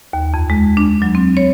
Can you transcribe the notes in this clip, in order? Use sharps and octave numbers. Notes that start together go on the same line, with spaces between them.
D#2
F2
G#3
D4
F#3
C4
C#5